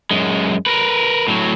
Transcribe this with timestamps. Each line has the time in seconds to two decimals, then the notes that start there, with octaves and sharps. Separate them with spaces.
0.11 F#2 G#3
0.66 A#4 B4
1.28 A2 F#3